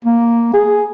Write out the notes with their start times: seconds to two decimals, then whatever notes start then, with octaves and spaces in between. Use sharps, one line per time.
0.04 A#3
0.53 G#4